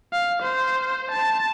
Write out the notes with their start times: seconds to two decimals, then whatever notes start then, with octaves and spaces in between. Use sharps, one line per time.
0.13 F5
0.42 C5
1.11 A5